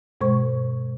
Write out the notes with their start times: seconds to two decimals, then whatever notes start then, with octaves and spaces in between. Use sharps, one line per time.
0.21 G2 B2 G#3 C5 C#6